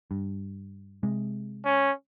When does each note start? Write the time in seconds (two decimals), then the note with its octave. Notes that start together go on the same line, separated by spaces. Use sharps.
0.11 G2
1.03 C3 G#3
1.65 C#4